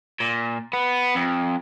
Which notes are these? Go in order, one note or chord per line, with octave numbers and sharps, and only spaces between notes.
A#2
B3
F2